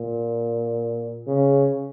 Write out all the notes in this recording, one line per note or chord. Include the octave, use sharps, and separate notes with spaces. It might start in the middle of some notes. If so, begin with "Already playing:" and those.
Already playing: A#2
C#3